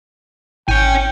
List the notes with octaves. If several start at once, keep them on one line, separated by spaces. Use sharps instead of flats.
G#1 C#5 G5 G#5